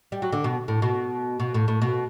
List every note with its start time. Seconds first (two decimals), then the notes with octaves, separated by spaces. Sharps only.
0.12 G3
0.22 F#3
0.32 D3
0.44 B2
0.68 A2
0.82 B2
1.40 B2
1.54 A2
1.68 A2
1.82 B2